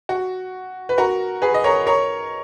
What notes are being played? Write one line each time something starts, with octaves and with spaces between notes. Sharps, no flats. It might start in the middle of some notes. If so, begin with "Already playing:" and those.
F#4
B4
F#4 A#4
G#4 B4
D#5
A#4 C#5
A#4 C#5